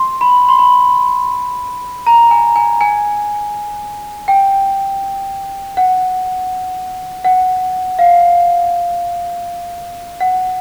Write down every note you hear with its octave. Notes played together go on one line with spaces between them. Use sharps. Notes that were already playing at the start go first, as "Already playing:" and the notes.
Already playing: C6
B5
C6
B5
A#5
G#5
G#5
G#5
G5
F#5
F#5
F5
F#5